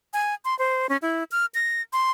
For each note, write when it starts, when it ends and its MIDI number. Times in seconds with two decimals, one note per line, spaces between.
0.13 0.34 80
0.45 0.57 84
0.59 0.87 72
0.89 0.97 61
1.02 1.24 64
1.32 1.46 89
1.55 1.82 94
1.93 2.12 84